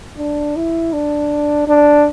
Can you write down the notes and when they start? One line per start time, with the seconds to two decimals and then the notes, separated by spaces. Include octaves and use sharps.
0.18 D4
0.56 E4
0.93 D4
1.68 D4